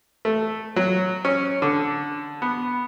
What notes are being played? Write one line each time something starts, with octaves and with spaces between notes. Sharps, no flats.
A3
F#3
C#4
D3
B3